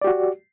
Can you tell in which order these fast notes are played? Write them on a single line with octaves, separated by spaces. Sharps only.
D5 G4 F#4